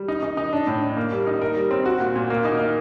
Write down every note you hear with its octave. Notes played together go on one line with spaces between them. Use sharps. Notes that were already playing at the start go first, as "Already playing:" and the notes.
Already playing: G3
D#4
D#4
D#4
D4
A2
D4
A#3
G3
D#4
A#4
G3
C4
F#4
A#2
A#2
A#3
D#4
A#3